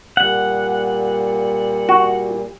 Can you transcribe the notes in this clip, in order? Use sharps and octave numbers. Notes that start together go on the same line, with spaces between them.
A#2 G3 F#5
F#4